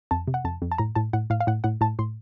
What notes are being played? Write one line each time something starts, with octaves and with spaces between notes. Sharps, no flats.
F2 A5
C3
F#5
F2 A5
F2
A5
A2 A#5
A2 A5
A2 F#5
A2 F5
F5
A2 F#5
A2 F#5
A2 A5
A2 C6